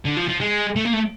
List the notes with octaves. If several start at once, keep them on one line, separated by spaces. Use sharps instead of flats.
D3
F3
F3
G#3
A3
A#3
A3